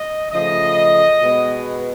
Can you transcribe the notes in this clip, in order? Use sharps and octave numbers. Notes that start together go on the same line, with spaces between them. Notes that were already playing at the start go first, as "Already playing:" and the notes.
Already playing: D#5
C#3 F3 A3 D#5
B2 G#3 B3